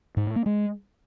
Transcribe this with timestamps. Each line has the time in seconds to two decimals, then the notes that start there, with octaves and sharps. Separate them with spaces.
0.17 G#2
0.26 A2
0.36 A#3
0.46 G#3